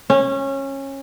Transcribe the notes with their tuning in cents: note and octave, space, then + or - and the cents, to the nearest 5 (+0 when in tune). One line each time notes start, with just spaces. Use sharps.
C#4 -20